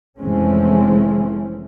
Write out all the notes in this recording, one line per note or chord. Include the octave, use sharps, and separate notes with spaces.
F1 E3 G#3 A3 C4 C#4